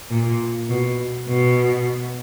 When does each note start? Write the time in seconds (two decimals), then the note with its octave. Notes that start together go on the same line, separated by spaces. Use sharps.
0.10 A#2
0.69 B2
1.28 B2